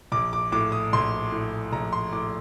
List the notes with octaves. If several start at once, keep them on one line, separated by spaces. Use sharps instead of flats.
A#1 D6
D6
A2 D6
D#6
A#1 C6
A2
A#1 A#5
C6
A2 D6